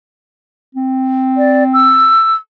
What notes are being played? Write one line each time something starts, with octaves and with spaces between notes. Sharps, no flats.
C4
D5
E6